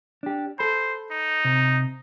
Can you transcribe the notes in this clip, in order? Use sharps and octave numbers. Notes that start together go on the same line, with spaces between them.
D4 G4
A4 C5 B5
D#4
C3